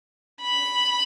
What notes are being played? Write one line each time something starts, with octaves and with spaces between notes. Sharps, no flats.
B5